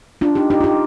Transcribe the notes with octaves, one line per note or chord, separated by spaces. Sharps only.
D4 F4
D#4 G4
D#4 G4
F4
D#4 G4